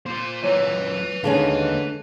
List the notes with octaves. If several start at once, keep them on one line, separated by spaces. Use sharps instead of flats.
A#3 F4 C5
F#2 A#2 E4 B4 C#5 G#5
D#2 D3 D#3 G#3 C#4 F5